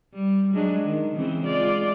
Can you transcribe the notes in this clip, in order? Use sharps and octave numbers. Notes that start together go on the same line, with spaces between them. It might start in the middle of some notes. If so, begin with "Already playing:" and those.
G3
F#3 G#3 D4
D#3
C#3 E3 C4
G#3 F4 D5